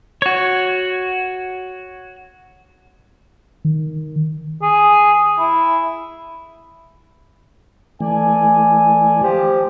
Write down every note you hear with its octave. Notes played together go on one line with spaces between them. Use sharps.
F#4 C#5
D#3
G#4
E4
E3 A3 A4 D5 G#5
F3 G4